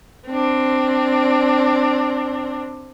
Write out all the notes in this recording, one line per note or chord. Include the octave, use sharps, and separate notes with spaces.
C4 D4